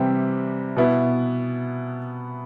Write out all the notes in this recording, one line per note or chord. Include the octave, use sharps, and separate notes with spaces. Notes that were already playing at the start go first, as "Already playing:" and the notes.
Already playing: C3 E3 G3 C4 G4
B2 B3 E4